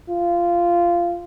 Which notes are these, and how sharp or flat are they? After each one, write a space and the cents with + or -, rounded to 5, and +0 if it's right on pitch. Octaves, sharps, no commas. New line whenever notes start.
F4 -15